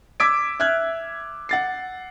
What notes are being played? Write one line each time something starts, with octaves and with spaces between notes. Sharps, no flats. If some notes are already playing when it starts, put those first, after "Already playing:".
D6 E6 G#6 B6 D7
E5 F6 F#6 G#6
F#5 A6 C7